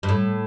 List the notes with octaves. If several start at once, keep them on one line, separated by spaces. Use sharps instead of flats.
G2
A2